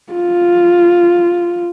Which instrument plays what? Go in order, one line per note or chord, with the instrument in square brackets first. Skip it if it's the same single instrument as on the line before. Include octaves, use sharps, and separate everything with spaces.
[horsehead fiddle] F4